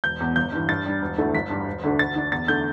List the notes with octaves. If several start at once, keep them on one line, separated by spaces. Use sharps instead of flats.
E1 G6
E2 B2
G1 G6
G2 E3
G2 A6
G3 D4
E1
D2 D3 A3 E4
G1 B6
G2 G3
E1
D2 D3 A3 D4
D2 A6
D3 A3 D4
E2 A6
D3 A3 G6